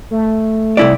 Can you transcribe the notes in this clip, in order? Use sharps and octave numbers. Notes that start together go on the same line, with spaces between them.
A3
C2 E4 D5